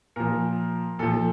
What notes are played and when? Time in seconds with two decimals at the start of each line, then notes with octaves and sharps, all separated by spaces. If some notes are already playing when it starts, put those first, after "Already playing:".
0.16 A#2 F3 A#4
0.99 A#2 F3 A4